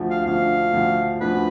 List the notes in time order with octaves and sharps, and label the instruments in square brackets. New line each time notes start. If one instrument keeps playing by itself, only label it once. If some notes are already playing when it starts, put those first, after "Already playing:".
Already playing: [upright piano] D2 D3 F3
[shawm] F5
[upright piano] D2 D3 F3 [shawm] F5
[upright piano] D2 D3 F3
[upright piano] D2 D3 F3 [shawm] B4